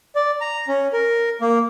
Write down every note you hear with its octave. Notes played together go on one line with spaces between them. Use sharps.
D5
A#5
C#4
A#4
A#3